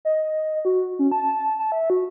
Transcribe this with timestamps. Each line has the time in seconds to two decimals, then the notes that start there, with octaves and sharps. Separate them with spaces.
0.05 D#5
0.65 F#4
0.99 C#4
1.12 A5
1.59 A5
1.72 E5
1.90 F#4